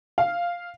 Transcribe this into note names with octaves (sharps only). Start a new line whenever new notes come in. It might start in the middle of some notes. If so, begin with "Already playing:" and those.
F5